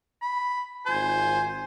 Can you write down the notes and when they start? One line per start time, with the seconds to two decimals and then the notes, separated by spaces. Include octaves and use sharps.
0.22 B5
0.86 G#1 F4 C5 G#5